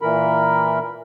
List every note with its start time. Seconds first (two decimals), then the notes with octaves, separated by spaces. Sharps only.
0.02 A#2 E3 A#4 B5